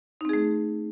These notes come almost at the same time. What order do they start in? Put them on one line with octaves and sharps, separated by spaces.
D#4 C4 G#4 A3